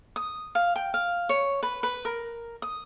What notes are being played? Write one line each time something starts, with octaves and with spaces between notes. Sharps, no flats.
D#6
F5
G5
F5
C#5
B4
B4
A#4
D#6